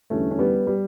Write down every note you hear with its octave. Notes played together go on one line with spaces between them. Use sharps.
E2 D3 G3 A3 C#4
C#4
G3 B3
G3